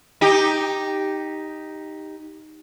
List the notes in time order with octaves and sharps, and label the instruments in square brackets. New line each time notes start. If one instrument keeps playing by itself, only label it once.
[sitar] D#4 G4